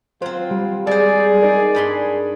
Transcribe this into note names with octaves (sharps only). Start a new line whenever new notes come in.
F#3 C4 F4 C5
G3
G#3 G#4 C5 D5
D#4 A#4 D5
G2 G#4 B5 C6